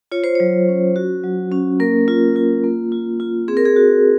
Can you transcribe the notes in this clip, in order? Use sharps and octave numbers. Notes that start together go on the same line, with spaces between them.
F4 C#5
C5
F#3 C#5
C#4
F#4
F#3
C#4
A#3 A#4
F4
F4
A#3
F4
F4
C4 G#4
A#4
G#4
F#4